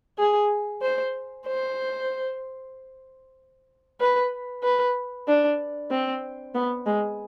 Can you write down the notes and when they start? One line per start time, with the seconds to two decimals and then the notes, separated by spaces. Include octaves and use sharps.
0.18 G#4
0.82 C5
1.46 C5
4.00 B4
4.63 B4
5.28 D4
5.91 C4
6.54 B3
6.86 G#3